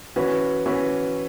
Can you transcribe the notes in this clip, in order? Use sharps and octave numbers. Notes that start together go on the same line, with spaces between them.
E3 C#4 F#4 B4
E3 C#4 F#4 B4